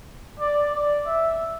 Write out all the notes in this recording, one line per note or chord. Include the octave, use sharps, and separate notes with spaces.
D5
D5
E5